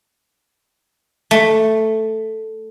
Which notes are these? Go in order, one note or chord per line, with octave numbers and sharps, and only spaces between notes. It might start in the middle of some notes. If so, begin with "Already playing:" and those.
A3